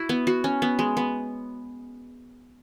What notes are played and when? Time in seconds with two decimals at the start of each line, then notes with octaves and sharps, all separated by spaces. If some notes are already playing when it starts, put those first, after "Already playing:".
Already playing: E4 F#4
0.09 B3
0.27 F#4
0.44 C#4
0.62 B3
0.79 G#3
0.97 B3